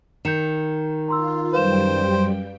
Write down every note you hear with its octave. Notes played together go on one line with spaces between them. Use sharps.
D#3 G6 C#7 E7
F4 A#5 C6 E6
F#2 G3 B4 C5 F5 G5 E7